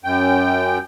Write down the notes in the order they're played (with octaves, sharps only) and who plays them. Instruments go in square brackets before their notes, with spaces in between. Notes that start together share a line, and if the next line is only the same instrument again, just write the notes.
[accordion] F#2 G5